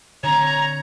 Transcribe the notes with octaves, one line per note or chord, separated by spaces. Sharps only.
D3 C4 C#5 A#5